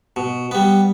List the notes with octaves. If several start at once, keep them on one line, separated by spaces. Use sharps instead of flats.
B2
G3 B3